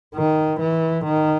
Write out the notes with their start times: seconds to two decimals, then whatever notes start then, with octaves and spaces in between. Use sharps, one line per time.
0.15 D#3
0.60 E3
1.05 D#3